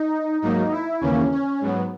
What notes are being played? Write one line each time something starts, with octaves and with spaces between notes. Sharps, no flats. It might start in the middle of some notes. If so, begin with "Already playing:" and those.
Already playing: D#4
G#2 F#3 A#3 D#4
E4
D#2 C#3 E3 A#3 C#4
C#4
G#2 F#3 B3